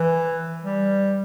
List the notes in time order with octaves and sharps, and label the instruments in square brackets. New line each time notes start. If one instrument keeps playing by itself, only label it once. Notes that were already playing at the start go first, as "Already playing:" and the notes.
Already playing: [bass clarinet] E3
G3